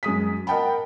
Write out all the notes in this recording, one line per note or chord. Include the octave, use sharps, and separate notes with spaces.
F#2 G#3 D#6 B6
A#4 D#5 F#5 G5 A5 B5